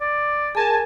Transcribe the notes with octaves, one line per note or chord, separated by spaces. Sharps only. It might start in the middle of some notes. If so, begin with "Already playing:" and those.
D5
G#4 A#4 G#5 A5